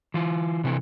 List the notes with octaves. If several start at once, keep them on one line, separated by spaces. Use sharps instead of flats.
E3 F4
C3 E3 C4 A4